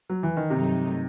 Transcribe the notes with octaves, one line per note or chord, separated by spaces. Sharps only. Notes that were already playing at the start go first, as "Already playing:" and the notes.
F#3
E3
D#3
G2 C3 D#3 F#3 A3 D#4